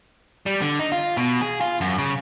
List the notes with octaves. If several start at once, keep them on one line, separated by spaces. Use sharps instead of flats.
G3
D3
D#4
F4
B2
G#4
F4
F#2
C#3